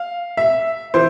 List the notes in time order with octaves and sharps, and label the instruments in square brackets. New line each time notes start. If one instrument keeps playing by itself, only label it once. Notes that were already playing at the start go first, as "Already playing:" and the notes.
Already playing: [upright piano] F5
E5
E3 C5